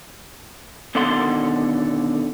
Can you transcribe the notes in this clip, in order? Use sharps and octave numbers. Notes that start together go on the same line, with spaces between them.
B2 D3 D#3 A4 F#5 C6